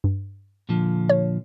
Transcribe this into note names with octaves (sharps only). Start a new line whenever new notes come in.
G2
A#2 D3 F3
C#5